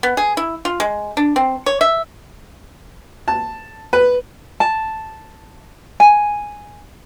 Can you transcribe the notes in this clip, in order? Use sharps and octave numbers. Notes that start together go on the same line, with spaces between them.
B3
G#4
E4
F4
G#3
D4
C4
C#5
E5
A5
B4
A5
G#5